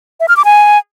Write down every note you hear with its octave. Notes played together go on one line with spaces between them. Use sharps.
E5
F6
D6
G#5